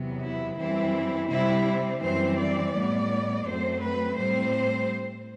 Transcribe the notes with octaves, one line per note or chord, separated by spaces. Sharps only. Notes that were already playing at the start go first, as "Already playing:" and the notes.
Already playing: E2 C3 F#3 B3
E4
F#2 E3 G3 C4 E4
C3 G3 C4 E4
F#2 E3 G3 C4 C5
D5
A2 G3 B3
F#2 F#3 A3 C4 C5
B4
A2 G3 C4 C5